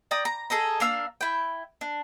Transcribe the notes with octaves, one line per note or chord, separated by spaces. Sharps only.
D5 G5 A#5 D#6
A#5
G#4 A4 D#5 A#5
A#3 D4 F5 E6
E4 G5
D4